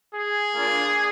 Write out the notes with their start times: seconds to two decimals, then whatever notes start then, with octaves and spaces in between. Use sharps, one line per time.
0.15 G#4
0.54 A#3 D4 F4